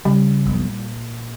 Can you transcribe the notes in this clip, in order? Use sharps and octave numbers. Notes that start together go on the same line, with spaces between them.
C#3 G3
F1 B1 E2
A#2